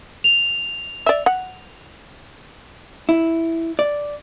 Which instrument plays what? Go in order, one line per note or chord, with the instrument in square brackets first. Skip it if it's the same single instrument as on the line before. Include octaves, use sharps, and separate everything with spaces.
[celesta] F7
[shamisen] D5 E5
F#5
[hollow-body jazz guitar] E4
D5